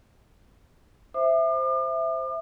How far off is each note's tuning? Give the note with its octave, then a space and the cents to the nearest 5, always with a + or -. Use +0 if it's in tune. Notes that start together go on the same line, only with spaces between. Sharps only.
C5 +0 E5 +0 D6 +45